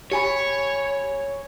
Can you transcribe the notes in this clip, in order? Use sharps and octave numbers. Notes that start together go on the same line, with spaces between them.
G4 C#5 G#5 B5